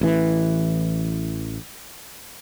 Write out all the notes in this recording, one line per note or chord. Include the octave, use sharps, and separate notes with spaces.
A1 E3